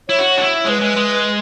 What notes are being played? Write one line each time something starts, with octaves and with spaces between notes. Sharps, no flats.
E4 C#5
F#4
D4
E4
G#3 B4 C#5
G#3
G#3